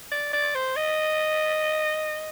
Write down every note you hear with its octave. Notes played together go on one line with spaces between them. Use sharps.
D5
D5
C5
D#5